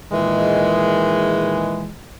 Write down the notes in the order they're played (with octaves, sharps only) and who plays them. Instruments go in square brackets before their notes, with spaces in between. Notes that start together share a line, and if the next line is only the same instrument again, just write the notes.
[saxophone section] A#2 D#3 E3 G#3